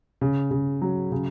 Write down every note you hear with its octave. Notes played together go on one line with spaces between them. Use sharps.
C#3
C#3
F#3
C#3